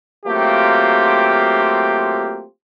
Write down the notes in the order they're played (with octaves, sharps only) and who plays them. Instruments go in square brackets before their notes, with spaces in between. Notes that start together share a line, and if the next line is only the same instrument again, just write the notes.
[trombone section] F#3 A3 A#3 C4 F4 G4